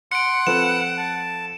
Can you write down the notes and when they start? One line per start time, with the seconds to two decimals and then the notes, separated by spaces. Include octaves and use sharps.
0.12 F#5 C6 C#7 D7
0.47 F3 C4 A4 B4 E7
0.97 A5